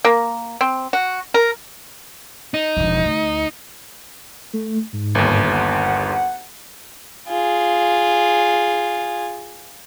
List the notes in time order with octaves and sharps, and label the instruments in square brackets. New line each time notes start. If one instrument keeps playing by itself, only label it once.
[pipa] A#3
C4
F#4
A#4
[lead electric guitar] D#4
[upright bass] E1 F3
D2
[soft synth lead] A3
G#2
[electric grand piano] G1 D#2
[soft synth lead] F#5
[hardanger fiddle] F4 G#4